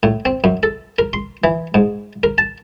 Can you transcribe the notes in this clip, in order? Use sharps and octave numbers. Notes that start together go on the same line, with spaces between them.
A2
C4
F#2
A4
A#4
C6
E3
G#2
A#4
A5